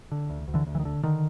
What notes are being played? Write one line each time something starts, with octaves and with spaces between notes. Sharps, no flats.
D3
D2
D2
D3 E3
D2
E3
D#3
D3
D3 D#3